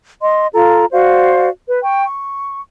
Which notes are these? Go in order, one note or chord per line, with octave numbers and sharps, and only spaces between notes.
D#5 C6
F4 A4 A#5
F#4 C5 D5 F5
B4
G5 C#6
C#6